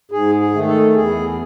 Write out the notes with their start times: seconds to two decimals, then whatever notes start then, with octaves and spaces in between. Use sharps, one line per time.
0.12 G#2 G#4
0.40 G#4
0.54 D#3 A3
0.68 A4
0.96 E2 G#4